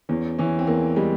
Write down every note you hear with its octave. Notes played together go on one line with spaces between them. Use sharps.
E2 C#4
E3 C#4
C4
E2 A#3
G3 G#3